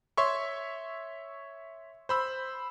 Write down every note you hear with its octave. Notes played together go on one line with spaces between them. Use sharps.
C#5 E5 C6 C#6
C5 B5 E6